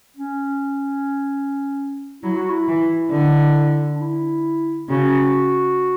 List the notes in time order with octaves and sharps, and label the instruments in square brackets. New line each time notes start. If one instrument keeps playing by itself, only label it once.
[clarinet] C#4
[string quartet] F#3 [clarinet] E4
[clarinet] F#4
E4
[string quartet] E3
D3
[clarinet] D4
E4
[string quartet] C#3 [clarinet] F#4